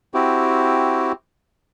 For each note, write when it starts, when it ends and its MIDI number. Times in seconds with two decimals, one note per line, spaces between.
0.14 1.12 60
0.14 1.12 64
0.14 1.12 66
0.14 1.12 67